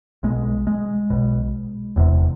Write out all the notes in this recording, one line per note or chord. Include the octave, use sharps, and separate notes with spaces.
B1 B2 G#3
G#3
B1 B2
E1 E2 C3